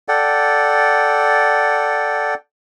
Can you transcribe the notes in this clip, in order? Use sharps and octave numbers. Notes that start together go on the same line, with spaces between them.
A4 D5 F#5 G5